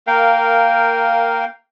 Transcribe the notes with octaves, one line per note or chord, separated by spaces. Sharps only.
A#3 A#4 F5 G5